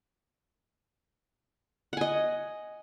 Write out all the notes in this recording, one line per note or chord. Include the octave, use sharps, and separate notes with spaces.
D#5 F#5 G#5